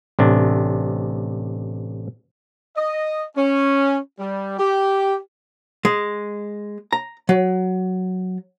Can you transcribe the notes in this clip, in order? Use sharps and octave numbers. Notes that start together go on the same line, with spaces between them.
A1 C3 D4
D#5
C#4
G3
G4
G#3
A#5
F#3